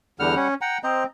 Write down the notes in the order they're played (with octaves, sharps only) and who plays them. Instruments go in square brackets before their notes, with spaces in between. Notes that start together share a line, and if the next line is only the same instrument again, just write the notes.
[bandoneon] E2 D3 F6 [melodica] G3 F#5
[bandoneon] C#4
[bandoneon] F#5 [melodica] G5 A#5
[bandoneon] C4 [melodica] C5 D#5 A#5